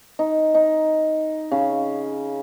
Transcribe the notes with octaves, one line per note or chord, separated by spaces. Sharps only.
D#4
D#4
C#3